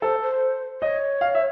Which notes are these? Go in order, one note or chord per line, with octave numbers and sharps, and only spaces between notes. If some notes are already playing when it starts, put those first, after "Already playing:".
A4 C5
C5
C#5 D#5
F5
E5